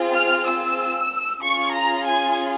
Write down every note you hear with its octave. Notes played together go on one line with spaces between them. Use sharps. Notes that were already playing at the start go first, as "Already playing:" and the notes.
Already playing: C4 F4 G#4
F6
E6
C#4 F4 G#4 C#6
A#5
G#5